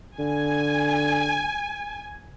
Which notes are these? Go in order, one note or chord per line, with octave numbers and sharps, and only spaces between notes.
D3 G#5